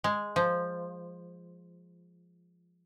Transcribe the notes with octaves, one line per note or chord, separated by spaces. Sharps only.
G#3
F3